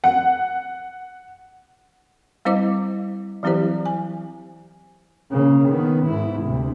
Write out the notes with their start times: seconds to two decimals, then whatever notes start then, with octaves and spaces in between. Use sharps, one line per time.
0.04 F#5
2.45 G3 C4 E4 C5 D#5 D6
3.43 E3 F#3 C4 E4 G4 C5
3.86 G#5
5.31 C#3 A#3
5.69 D#3 B3
6.06 G#2 E4
6.41 D2 C3